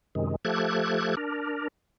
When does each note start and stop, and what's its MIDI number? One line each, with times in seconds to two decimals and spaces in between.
0.15 0.36 42
0.15 0.36 48
0.15 0.36 51
0.15 0.36 56
0.45 1.15 53
0.45 1.15 57
0.45 1.15 67
0.45 1.15 69
0.45 1.15 90
0.45 1.15 92
1.17 1.68 62
1.17 1.68 70